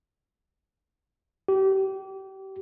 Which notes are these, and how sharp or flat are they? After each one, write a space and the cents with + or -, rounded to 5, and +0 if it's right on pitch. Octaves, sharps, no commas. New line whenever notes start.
G4 -30